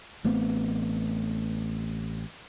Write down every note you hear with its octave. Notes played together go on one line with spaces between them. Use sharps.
A1 A3 B3 C4